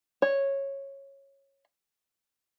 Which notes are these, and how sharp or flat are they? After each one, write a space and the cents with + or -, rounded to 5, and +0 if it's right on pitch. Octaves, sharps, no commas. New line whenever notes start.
C#5 -10